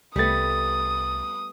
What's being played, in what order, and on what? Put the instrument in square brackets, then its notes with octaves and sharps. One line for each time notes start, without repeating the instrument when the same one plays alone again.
[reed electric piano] C2 A6 [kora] G3 A3 B3 [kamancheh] D#6